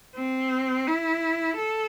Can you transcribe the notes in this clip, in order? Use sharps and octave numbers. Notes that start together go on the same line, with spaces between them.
C4
E4
A4